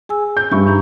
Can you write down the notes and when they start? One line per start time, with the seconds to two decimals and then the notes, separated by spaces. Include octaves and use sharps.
0.09 G#4 G#5 E6
0.37 G6
0.51 G2 G3 E5 B5 C#6
0.67 D4 D#4 A#5